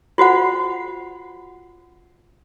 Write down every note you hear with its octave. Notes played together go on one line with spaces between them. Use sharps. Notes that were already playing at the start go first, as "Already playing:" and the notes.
F4 F#4 C5 F#5